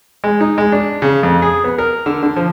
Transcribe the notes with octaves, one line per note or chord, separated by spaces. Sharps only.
G#3
D#4
G#3
D4
C#3
F2
G#4
B3
A#4
D3
D3
F3